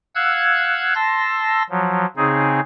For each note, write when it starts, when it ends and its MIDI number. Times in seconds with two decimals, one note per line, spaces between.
0.15 0.94 77
0.15 0.94 78
0.15 0.94 88
0.15 0.94 90
0.15 0.94 92
0.95 1.63 81
0.95 1.63 84
0.95 1.63 88
0.95 1.63 94
1.70 2.06 53
1.70 2.06 54
2.17 2.60 49
2.17 2.60 60
2.17 2.60 63
2.17 2.60 68